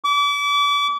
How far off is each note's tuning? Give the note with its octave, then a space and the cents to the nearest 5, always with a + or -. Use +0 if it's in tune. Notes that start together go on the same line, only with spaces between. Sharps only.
D6 -35